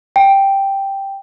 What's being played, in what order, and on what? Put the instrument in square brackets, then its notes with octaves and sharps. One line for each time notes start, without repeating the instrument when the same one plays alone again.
[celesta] G5